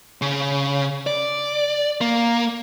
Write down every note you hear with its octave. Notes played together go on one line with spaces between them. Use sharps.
C#3
D5
A#3